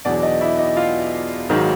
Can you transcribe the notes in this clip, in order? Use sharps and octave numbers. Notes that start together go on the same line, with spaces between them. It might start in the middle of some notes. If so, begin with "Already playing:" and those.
E2 B2 F#3 D4 D5
D#4 D#5
E4 E5
D#4 D#5
F4 F5
G#1 G#2 D#3 F#3